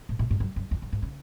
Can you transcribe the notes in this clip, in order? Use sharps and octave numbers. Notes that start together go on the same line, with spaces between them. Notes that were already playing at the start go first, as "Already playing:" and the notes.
A2
A2
G#2
F#2
F#2
E2
F#2
G#2
C#3